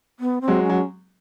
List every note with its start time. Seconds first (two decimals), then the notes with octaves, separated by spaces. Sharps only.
0.20 B3
0.41 C4
0.48 F#3 G#3
0.63 C#4
0.70 F#3